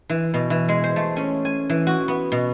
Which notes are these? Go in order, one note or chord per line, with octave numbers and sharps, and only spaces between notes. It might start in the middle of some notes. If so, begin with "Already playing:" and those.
E3
B2
E3
G#3
C5
A3
C#4
G#5
E3
F#4
B3
B2